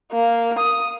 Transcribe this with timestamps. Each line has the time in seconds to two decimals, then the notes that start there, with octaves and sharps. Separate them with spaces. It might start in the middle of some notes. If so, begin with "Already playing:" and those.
0.13 A#3
0.59 D#6